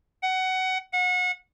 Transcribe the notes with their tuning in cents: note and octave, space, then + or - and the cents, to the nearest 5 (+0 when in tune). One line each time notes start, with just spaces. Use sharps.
F#5 +20
F#5 -30